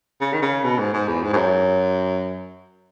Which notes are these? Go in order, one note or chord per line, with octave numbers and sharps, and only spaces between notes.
C#3
D#3
C#3
B2
G#2
G#2
E2
G#2
G#2
F#2